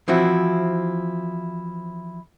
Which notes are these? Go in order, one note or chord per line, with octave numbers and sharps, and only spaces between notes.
E3 F3 C4 E4 F#4